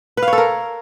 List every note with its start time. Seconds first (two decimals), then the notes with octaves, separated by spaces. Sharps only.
0.17 B4
0.22 F5
0.28 C#5
0.33 A4
0.38 A#4